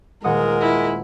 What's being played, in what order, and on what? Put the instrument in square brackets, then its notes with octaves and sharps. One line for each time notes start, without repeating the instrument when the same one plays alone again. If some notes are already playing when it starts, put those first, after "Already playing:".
[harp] D#1 F#5 D#6 [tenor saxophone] G#3 [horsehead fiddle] A#4
[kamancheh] E4